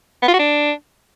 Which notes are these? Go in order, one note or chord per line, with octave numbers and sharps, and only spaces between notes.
B3
F4
F#4
D4